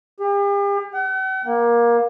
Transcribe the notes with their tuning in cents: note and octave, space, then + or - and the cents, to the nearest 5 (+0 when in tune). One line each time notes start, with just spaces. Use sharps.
G4 +45
F#5 +45
A#3 +20